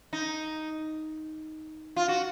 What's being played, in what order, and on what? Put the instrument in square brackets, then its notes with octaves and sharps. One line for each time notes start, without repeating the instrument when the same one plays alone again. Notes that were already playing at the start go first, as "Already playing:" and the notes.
[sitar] D#4
F4
F#4